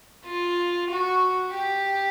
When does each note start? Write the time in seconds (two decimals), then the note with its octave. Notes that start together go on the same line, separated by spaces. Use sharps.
0.25 F4
0.90 F#4
1.55 G4